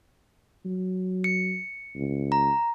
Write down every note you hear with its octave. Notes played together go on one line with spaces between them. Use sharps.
F#3
C#7
C#2
A#5